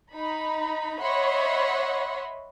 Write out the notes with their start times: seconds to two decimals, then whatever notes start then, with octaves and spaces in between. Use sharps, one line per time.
0.14 D#4 B5
1.00 C#5 D#5 E5 F#5 B5 C6